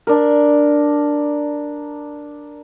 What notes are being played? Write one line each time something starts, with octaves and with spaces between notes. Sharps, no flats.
D4 A#4